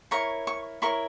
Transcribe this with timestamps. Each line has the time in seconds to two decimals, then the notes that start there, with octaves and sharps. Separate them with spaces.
0.11 E4 A#4 C#5 C#6
0.47 C#6
0.82 E4 A#4 C#5 C#6